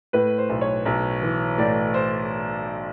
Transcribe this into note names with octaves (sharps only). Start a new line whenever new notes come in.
A2 B4
C5
B1
C#5
B1
E3
A2 D5
C5